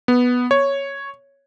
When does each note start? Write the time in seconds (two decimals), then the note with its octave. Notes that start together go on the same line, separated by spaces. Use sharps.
0.08 B3
0.51 C#5